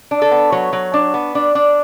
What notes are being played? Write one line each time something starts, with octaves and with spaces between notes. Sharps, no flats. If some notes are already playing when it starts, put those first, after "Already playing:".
D4
A4
B3
F#3 C#5
F#3
D4
B3
D4
D4